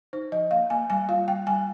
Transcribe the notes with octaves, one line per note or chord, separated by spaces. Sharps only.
D#4 C5
F3 D#5
A#3 F5
A#3 G#5
G3 G#5
F4 F5
G3 G5
G3 G#5